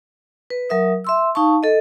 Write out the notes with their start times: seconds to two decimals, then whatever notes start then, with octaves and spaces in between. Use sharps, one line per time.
0.50 B4
0.70 F#3 A#4 E5 D#6
1.04 E5 C6 E6
1.35 D#4 F5 A5 C#6
1.63 A4 D#5